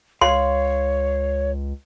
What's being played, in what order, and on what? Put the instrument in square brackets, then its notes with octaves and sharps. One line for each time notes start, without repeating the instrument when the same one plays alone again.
[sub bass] C#2 [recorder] C#5 [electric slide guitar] F5 [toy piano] C6